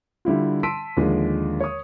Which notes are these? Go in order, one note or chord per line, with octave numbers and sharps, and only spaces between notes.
D3 G3 E4 F4
A5 C6 E6 B6 D7 D#7
D#2 D3 F3 G#3
C#5 D#6